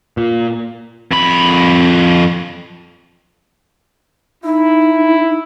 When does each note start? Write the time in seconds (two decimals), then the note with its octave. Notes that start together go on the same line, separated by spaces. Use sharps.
0.17 A#2
1.12 F2 B5
4.44 D#4 E4